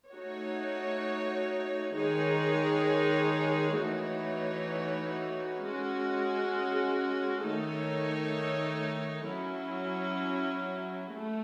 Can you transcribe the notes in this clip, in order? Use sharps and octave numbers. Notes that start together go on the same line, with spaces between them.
A3 D#4 F#4 C#5
D#3 G#3 D#4 G#4 C#5
E3 A3 D#4 F#4 C#5
G#3 C#4 F#4
D#3 A3 D#4 A4 C#5
F#3 C#4 E4
A3